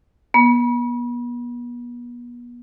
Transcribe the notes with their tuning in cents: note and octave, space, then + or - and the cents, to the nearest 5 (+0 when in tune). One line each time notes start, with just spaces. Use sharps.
B3 -35